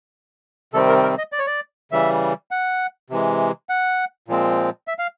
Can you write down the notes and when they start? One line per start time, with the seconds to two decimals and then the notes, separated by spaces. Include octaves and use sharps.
0.74 C3 D#3 G3 C4 A4
0.89 A#4
1.03 A#4
1.18 D#5
1.32 D5
1.39 C#5
1.47 D5
1.92 C#3 E3 G3 E5
2.51 F#5
3.10 C3 E3 G#3
3.69 F#5
4.28 A#2 F3 G#3 C4
4.88 E5
4.99 F5